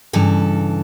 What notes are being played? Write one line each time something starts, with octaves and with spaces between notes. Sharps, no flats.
G2 C#3 E3 A4